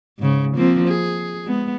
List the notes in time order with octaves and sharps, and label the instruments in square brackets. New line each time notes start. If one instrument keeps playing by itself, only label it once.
[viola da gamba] G#2 C#3
F3 A#3 C4
G#4
G#3 B3